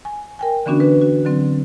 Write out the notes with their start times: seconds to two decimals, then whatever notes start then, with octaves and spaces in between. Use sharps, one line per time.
0.05 G#5
0.39 A#4 G5 G#5
0.66 D3 E3 B3 C#4 D4 F#4
0.80 B4
1.01 F#4
1.25 D3 F#3 C4